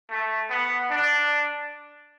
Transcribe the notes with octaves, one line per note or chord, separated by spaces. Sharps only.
A3
B3
D4